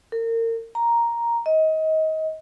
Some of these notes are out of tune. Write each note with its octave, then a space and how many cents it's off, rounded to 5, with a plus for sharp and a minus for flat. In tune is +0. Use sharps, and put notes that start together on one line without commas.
A#4 -35
A#5 +5
D#5 +25